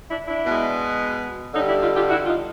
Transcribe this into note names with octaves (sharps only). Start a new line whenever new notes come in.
D4 E4
D4 E4
B2 G#3
G2 D3 G3 C#4 D#4
D4 E4
D#4 F4
F4 G4
E4 F#4
D#4 F4